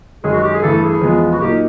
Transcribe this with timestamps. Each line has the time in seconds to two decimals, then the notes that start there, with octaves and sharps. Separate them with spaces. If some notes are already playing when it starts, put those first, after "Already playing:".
0.24 F#2 D#3 G#3 G#4
0.33 F#4
0.43 G4
0.53 G#4
0.62 G2 E3 A3 A4
0.82 G#4
1.01 E2 C#3 F3 G#3 B3
1.33 F#4
1.40 A#2 F#3 A#3 D#4 G4